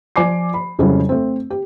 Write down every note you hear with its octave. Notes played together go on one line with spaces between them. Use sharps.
F3 D5 G#5 D6 C7
B5
F2 C#3 F#3 G3 C#4 E4
A3 C4
G4